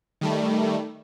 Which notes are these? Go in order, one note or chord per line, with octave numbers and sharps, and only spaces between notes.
D#3 G3 A3